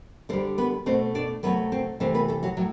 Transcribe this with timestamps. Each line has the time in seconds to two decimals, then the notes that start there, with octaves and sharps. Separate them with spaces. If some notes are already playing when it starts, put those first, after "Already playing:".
0.29 D3 C4 C5
0.33 G3
0.58 B3 B4
0.86 B2 A3 C4 C5
1.15 D4 D5
1.43 C3 F#3 A3 B3 B4
1.72 C4 C5
2.00 C3 E3 A3 C4 C5
2.14 B3 B4
2.28 A3 A4
2.43 F#3 F#4
2.57 A2 F#3